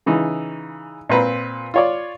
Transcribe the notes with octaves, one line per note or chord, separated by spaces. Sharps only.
C#3 E3 D#4
A#2 C4 B4 A#5
F4 C#5 D5